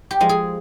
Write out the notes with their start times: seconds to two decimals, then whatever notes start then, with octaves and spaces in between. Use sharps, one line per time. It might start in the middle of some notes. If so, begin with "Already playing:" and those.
0.11 G4
0.20 F3 G#3
0.29 G#4